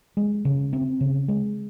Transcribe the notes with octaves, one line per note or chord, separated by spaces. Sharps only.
G#3
C#3
C4
C#3
G#3